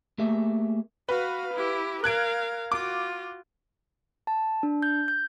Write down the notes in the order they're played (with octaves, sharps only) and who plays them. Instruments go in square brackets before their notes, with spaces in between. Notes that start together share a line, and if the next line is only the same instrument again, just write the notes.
[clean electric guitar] A3 A#3 G4 G#4 E5
[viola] F#4 F5 [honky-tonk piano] B4
[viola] E4 G4
[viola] A#4 F5 [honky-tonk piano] F#6 G#6 D7
[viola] F4 F#4 [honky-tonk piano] D6
[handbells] A5
D4
G6
G6